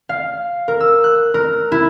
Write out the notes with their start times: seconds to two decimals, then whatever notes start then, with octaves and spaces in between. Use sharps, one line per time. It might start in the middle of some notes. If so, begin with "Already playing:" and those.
0.09 F5
0.68 A#4
0.80 E6
1.04 F#6
1.34 A#4
1.72 E4